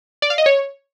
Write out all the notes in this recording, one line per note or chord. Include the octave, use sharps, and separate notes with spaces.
D5
F5
D#5
C#5